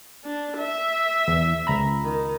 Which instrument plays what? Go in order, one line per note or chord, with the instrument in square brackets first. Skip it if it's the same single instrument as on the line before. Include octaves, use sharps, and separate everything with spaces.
[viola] D4
E5
[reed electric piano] E2
C#2 A#5 B5
[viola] D#3